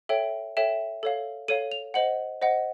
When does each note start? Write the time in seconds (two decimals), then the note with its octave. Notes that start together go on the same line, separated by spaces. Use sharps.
0.09 A4 C#5 E5 G5 D7
0.57 A4 C#5 E5 G5 E7
1.03 A4 C#5 F5
1.48 A4 C#5 F5 D#7
1.72 F7
1.94 C5 D#5 F#5 F#7
2.41 C5 D#5 F#5